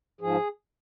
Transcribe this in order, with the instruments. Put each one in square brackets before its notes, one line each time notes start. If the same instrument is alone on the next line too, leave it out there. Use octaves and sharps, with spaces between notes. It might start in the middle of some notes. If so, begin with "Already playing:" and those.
[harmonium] G#2 F3 G#4